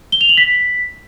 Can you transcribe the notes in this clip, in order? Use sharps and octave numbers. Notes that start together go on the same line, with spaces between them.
G7
F7
F#7
B6